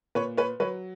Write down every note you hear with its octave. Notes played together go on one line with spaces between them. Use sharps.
A#2 B4 C#5
B4 C#5
F#3 B4 C#5